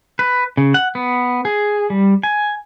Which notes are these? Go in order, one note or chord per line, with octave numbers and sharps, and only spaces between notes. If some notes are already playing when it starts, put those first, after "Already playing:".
B4
C#3
F#5
B3
G#4
G3
G#5